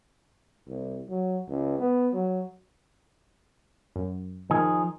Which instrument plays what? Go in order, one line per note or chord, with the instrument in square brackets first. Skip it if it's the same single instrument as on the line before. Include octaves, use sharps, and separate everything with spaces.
[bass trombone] C2
F#3
C#2
B3
F#3
[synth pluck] F#2
[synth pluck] D#3 [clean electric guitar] F3 D#4 G#4